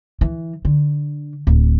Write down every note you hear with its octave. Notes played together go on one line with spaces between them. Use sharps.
E3
D3
D1